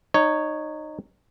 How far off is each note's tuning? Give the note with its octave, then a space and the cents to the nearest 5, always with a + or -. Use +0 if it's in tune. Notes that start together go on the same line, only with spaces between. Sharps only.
D#4 -20 C#5 +0